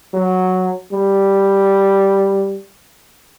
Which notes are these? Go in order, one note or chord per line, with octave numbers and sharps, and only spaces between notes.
F#3
G3